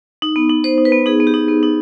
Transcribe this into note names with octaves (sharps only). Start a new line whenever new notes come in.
D#4
B3
D#4
B3 C5
D#4
B4
B3
D#4 G#4
B3
G4
D#4
B3
D#4